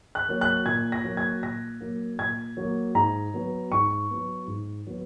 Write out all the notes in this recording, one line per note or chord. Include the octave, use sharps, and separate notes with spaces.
F#6
F#3 A#3
F#6
A#2 G#6
A#6
F#3 A#3
G#6
A#2 A#6
F#3 A#3
A#2 G#6
F#3 A#3
G#2 A#5
F#3 B3
G#2 C#6
F#3 B3
G#2
F#3 B3